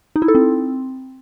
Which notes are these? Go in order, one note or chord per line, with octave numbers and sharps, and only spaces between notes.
D#4
E4
A4
C4